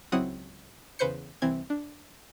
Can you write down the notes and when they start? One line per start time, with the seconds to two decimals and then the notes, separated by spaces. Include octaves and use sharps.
0.12 C#2 F#3 C4 E4 F#5 D#6
0.99 E2 C#3 B4 C5 G6 C#7
1.42 C2 E3 C4 G#6
1.70 D4